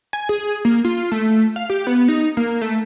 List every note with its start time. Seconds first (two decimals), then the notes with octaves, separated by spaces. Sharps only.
0.13 G#5
0.29 G#4
0.65 A#3
0.85 F4
1.12 A3
1.56 F5
1.70 G4
1.87 B3
2.08 D#4
2.37 A#3
2.61 A3